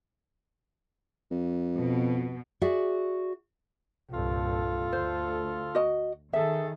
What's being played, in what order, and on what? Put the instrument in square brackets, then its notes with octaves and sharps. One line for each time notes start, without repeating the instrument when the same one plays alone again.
[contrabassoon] F2
[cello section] B2
[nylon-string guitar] F#4 G#4 D5 E5
[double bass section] C2 G2 A#2 [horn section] F4 A4
[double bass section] D2 [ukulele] C5
[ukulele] F#4 D#5
[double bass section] D#3 [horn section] G#4 A4 [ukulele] E5